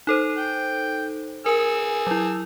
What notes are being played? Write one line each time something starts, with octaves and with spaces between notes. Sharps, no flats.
D#4 A4 C5
G5
G#4 A#4 G#5 E6
F#3 E4